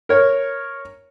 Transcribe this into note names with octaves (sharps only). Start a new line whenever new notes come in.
A#4 C#5